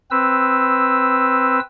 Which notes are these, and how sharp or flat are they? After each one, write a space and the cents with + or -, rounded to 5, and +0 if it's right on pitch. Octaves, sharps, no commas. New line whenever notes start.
C4 +0 B4 +0 E6 +0